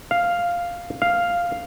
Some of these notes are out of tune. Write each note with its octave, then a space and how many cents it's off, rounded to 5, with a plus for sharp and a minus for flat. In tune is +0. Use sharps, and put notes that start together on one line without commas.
F5 +0
F5 +0